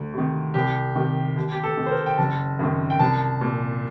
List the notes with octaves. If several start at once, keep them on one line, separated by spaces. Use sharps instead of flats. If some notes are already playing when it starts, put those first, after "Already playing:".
Already playing: D2
C3 D#3
C2 G4
C3 D#3
D#2
G4
A4
D#3
C5
A#4
G5
F#1 A5
F#2 D#3
G5
C2 A5
A#2